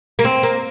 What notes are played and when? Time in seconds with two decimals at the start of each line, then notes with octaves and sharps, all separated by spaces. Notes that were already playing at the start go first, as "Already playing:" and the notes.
0.19 A#3
0.25 C4
0.43 A#3